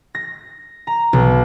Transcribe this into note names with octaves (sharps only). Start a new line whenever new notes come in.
A#6
A#5
B1